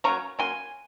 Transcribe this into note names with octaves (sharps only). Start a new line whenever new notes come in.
F#3 A#3 C#4 A#5 C#6
F#3 A#3 C#4 G#5 C6